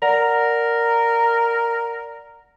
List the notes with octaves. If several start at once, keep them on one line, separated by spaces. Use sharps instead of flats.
A#4 D5 F#5